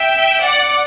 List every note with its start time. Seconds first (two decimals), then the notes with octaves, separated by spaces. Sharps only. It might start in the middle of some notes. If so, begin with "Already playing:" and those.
Already playing: E5 G5
0.43 D5 F#5